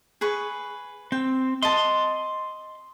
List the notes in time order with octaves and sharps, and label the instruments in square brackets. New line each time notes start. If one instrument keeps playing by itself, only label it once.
[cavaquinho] G#4 B4 C#6
[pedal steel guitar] C4 [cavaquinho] G5
[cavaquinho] D#5 A5 [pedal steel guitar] C6